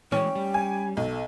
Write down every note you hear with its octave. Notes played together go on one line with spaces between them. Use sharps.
E3 G#3 C#4 G5
G3
G#5
B1 A4